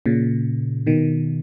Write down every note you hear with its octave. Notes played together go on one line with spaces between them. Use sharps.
A#2 C#3
B2 D#3